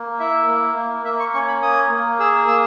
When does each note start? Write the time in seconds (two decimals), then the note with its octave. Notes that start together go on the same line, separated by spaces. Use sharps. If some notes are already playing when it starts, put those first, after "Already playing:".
Already playing: A#3
0.20 E4 E5
0.48 A#3
0.76 A#3
1.05 A#3 E5
1.19 C#6
1.34 C#4 C#6
1.48 B5
1.62 A#3 D#6
1.91 A#3
2.19 G#4 E6
2.48 A#3 E6